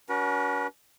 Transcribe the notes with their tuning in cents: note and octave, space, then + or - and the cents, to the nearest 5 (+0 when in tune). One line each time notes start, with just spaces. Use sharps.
C#4 +45 F#4 +15 B4 -45